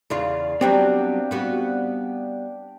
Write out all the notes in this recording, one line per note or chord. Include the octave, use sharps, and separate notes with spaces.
E2 C#3 F4 D5 F5
F#3 G3 B3 C4 D4 G4
G3 B3 F#4